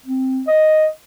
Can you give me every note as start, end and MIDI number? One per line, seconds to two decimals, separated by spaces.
0.06 0.42 60
0.47 0.86 75